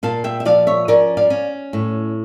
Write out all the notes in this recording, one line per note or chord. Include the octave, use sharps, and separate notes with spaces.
A#2 F5 A5
E5 G5
E5
F3 D5 F5
C#5 E5
C#4 A#4 D5
D5 F5
C#4
A2